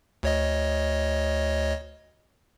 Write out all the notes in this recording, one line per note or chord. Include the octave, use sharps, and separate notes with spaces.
D2 C#5 D#5